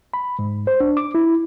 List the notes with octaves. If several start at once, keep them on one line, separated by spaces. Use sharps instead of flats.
B5
G#2
C5
D4
D6
E4